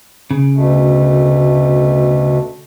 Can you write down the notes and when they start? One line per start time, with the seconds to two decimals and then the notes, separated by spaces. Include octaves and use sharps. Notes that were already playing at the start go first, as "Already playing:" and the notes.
0.31 C#3
0.55 D2 B2 A3